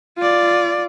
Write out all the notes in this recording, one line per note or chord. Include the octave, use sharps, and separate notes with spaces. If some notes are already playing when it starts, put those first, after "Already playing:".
F4 D5